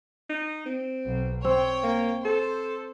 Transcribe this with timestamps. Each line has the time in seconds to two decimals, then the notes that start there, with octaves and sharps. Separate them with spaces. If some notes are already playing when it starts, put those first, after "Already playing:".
0.30 D#4
0.66 C4
1.07 B1
1.45 C4 C#5 G5
1.83 A#3
2.25 A4 C5